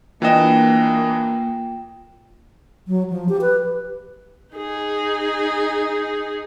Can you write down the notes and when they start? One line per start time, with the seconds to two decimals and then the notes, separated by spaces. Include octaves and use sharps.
0.22 E3 A#3 D4 F4 D#5 G5 E7
2.88 F#3
3.10 F3
3.29 G4
3.41 B4
4.55 D#4 G#4